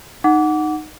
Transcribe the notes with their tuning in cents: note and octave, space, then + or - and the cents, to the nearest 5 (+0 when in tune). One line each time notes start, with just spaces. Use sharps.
D#4 -15 F#5 +0 D6 -25